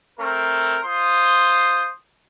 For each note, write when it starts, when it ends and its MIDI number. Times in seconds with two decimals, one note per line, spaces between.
0.20 0.80 57
0.20 0.80 60
0.20 0.80 70
0.84 1.91 65
0.84 1.91 72
0.84 1.91 84
0.84 1.91 87